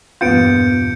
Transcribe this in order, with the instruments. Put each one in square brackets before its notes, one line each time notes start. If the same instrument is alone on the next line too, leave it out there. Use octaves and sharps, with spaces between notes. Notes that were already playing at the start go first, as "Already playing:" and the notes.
[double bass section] E2 G2 A#2 [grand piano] B3 F4 [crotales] G6 C#7 D7